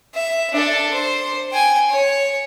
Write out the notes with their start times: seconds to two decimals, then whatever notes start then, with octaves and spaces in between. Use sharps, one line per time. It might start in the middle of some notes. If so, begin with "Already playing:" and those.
0.14 E5
0.52 D4 A4
0.94 C5
1.52 G5 G#5
1.89 C#5